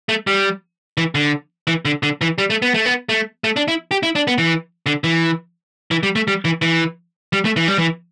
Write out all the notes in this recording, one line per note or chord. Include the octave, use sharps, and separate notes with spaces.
A3
G3
E3
D3
E3
D3
D3
E3
G3
A3
B3
A3
B3
A3
A3
D4
E4
G4
E4
D4
B3
E3
D3
E3
E3
G3
A3
G3
E3
E3
G3
A3
E3
G3
E3